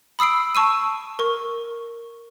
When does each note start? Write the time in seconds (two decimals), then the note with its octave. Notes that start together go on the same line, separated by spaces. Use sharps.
0.19 B5 D#6 E6 C7 D7
0.55 A5 C#6 E6 D#7
1.19 A#4 C#6